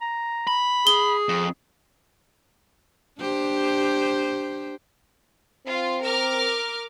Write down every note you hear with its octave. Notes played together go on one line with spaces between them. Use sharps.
A#5
B5
G#4 G7
F2
D4 G4 C5
C4 F4
A#4 D6 F6